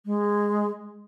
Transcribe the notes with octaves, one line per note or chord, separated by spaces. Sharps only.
G#3